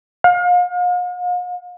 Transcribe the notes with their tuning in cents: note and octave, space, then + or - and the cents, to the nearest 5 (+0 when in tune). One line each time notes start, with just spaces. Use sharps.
F5 +40